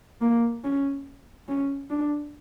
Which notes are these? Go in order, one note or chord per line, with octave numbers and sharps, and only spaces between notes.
A#3
C#4
C#4
D4